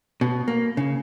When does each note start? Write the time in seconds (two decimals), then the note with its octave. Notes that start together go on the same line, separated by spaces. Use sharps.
0.21 B2
0.48 A#3
0.77 C#3